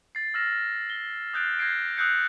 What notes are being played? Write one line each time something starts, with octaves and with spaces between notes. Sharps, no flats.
A6 C7
E6 F6 A6 A#6 E7
G7
D#6 F#6 G6 A6 C7 D7
G6 G#6 A#6 C7 D7
D#6 E6 F#6 G6 C7 C#7